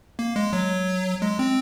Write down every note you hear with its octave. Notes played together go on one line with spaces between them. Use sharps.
A#3
G#3
F#3
G#3
C4